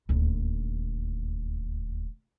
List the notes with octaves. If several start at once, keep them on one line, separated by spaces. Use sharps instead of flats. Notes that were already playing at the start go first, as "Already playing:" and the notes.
D#1 D2